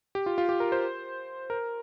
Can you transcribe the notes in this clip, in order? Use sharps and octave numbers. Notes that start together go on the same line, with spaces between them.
G4
F4
F4
G4
A#4
C5
A#4